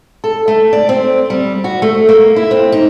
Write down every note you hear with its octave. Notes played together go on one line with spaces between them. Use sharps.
A4
A3
D5
C4
G3
F#4
A3
A#3
E4
C4
D#4